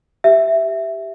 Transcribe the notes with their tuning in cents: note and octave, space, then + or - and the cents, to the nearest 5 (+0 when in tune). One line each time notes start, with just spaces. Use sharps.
G4 +0 E5 +0